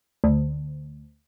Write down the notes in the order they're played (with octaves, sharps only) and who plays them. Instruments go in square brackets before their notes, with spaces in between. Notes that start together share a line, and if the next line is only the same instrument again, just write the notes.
[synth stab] D2